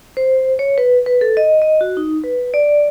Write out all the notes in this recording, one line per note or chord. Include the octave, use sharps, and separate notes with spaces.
C5
C#5
B4
B4
A4
D#5
D#5
F#4
D#4
B4
D5